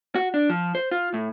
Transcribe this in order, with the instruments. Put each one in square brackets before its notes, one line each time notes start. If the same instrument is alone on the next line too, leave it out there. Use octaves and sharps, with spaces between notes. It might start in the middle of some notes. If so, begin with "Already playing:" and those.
[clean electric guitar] F#4
D4
F3
C5
F4
A2